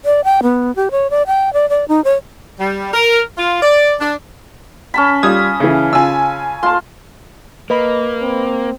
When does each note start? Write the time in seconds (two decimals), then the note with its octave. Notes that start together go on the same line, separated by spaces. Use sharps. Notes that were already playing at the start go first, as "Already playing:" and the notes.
0.05 D5
0.24 G5
0.43 B3
0.76 G4
0.91 C#5
1.10 D5
1.27 G5
1.53 D5
1.69 D5
1.88 D#4
2.04 C#5
2.59 G3
2.94 A#4
3.37 F4
3.63 D5
4.00 D4
4.94 C#4 A5 B5
5.23 G3 F4 D#6 G#6
5.60 C#3 E3
5.93 C#3 F4 G#5 E6
6.63 F4 A5 C6
7.70 A#3 B4 D#5 B5
8.22 C4